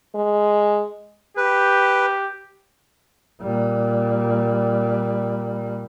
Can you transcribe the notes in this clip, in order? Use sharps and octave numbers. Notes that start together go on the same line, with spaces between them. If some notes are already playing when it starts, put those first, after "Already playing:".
G#3
G4 B4
A#2 G3